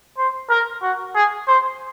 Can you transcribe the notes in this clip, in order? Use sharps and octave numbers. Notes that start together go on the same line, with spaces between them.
C5
A#4
F#4
G#4
C5